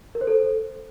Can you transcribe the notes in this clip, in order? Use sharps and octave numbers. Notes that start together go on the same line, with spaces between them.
A#4
C5
A4